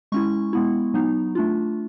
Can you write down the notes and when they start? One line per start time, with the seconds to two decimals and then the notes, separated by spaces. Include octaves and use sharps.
0.12 G#3 C#4 E4 C#6
0.53 G#3 B3 E4
0.94 F#3 B3 D#4
1.35 A3 D4 F4